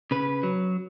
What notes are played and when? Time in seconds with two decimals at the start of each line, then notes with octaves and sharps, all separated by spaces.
0.11 C#3 B4
0.43 F#3